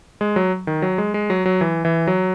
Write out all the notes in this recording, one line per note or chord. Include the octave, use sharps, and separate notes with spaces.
G#3
F#3
D#3
F#3
G#3
G#3
F#3
F#3
E3
E3
F#3